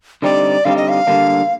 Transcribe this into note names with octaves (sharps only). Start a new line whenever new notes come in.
D3 G3 C4 D#4 G4 D5
D3 G3 C4 D#4 G4 F5
D#5
F5
D3 G3 A#3 D4